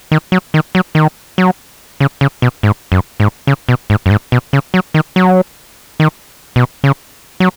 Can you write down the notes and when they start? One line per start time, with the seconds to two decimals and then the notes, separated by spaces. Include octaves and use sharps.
0.12 D#3
0.32 F#3
0.54 D#3
0.75 F#3
0.95 D#3
1.38 F#3
2.00 C#3
2.21 C#3
2.42 B2
2.63 G#2
2.92 F#2
3.20 G#2
3.47 C#3
3.69 B2
3.90 G#2
4.06 F#2
4.11 G#2
4.32 B2
4.53 C#3
4.74 F#3
4.94 D#3
5.16 F#3
6.00 D#3
6.56 B2
6.84 C#3
7.40 F#3